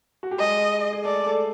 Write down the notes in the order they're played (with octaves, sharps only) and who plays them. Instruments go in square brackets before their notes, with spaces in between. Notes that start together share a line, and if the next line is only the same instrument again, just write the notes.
[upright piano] F#4
G4
[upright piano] G#3 G#4 [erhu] D#5
[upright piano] G#4
[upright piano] A3 A4 [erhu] D5
[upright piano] A3 A4